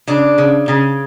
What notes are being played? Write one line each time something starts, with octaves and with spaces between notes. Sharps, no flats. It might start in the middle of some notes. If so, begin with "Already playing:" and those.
C#3 D4
C#3
C#3